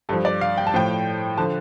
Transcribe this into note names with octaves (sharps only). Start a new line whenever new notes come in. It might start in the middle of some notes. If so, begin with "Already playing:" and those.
G2 F3 A4
D5
F5
G5
A5
A2 F3 G5
D3 F3 A5